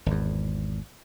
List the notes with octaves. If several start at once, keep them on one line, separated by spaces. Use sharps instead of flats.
G#1 E2